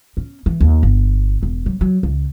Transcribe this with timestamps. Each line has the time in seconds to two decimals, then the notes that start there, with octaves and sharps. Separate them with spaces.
0.17 C#4
0.46 E3
0.61 D#2
0.83 G1
1.43 E1
1.66 F#3
1.81 F#3
2.03 C#2